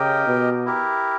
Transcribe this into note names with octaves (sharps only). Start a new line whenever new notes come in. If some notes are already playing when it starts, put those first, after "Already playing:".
Already playing: C#3 G4 A#4 D#5 G5
B2
E4 G4 A#4